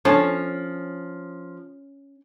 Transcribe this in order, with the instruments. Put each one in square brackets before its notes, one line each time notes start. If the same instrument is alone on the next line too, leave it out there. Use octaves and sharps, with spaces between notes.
[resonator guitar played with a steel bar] F3 [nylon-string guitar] C#4 [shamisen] D4 A4 C#5